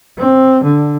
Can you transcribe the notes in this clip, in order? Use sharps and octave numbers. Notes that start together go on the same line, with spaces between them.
C4
D3